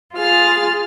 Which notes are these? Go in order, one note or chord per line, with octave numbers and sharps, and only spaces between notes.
F4 G#4 F6 A6